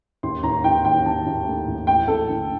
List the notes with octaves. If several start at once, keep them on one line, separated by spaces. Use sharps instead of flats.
D#2 C6
D#2 A#5
D#3 G5
D#2 G5
D#3 A5
D#2
A3
D#2
A1 G5
A1 A4
D3